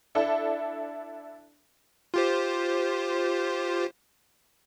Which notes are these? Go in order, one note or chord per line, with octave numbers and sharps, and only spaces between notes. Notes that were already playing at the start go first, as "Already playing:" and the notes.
D4 E4 A4
F4 G4 C5